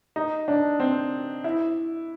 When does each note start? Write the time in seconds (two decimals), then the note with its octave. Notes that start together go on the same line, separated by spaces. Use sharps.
0.16 D#4
0.48 D4
0.80 C4
1.44 E4